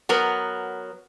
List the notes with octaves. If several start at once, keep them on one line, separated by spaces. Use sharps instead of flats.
F#3 B3 A#4